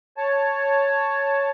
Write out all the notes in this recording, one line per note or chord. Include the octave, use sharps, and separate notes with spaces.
C#5 A5